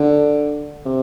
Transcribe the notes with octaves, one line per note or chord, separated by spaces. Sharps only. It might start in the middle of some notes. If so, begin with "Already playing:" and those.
Already playing: D3
C3